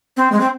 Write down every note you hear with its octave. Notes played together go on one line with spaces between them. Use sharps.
C4
G#3
C4